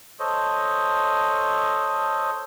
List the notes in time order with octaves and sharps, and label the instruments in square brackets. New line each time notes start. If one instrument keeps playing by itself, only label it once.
[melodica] A4 C5 C#5 D#5